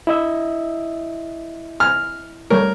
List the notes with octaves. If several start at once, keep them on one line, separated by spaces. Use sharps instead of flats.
E4 D#5 E5
G#5 F6
G3 A3 A#4 C#5